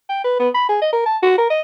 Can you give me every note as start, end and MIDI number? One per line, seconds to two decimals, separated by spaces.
0.09 0.24 79
0.24 0.39 71
0.40 0.49 59
0.54 0.67 83
0.69 0.78 68
0.81 0.89 75
0.93 1.02 70
1.06 1.17 81
1.23 1.37 66
1.38 1.47 70
1.50 1.61 75